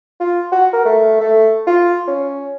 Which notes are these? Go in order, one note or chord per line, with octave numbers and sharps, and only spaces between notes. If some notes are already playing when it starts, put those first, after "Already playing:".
F4
F#4
A#4
A3
A3
F4
C#4